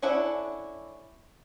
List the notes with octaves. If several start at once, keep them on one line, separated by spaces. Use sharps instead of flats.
C#4 D4 E4 A4 F#5